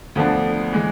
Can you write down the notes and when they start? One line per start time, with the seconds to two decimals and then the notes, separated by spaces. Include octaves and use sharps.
0.16 D2 D3 F3 B3 D4
0.73 E3 G#3